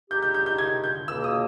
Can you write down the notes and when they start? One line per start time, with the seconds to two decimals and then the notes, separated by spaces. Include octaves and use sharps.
0.10 D#3 G#3 D#4 G4 G6
0.22 G6
0.34 G6
0.46 G6
0.58 G#6
0.84 G6
1.08 C#2 B2 A#3 E6
1.24 D#6